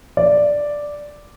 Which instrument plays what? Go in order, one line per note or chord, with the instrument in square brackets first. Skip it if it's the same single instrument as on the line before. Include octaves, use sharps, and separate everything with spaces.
[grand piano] D5